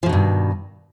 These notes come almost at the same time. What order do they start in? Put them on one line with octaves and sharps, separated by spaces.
F3 B2 D#3 G2